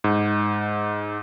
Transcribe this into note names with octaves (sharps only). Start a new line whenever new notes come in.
G#2